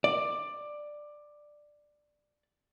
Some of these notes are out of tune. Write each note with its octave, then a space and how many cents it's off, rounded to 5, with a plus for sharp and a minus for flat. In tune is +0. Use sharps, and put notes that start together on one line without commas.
D5 +10